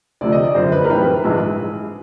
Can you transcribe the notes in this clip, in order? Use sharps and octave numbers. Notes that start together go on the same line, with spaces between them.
D2 C3 F3 A3 D5
D#5
D5
F#2 D3 F3 C5
B4
A#4
B1 A2 E3 G3 C4 B4
A#1 G#2 E3 G#3